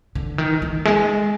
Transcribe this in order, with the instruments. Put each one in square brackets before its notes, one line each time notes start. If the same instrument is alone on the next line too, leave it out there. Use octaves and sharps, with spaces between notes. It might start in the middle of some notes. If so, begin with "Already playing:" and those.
[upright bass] D3
D#3
D#3
G#3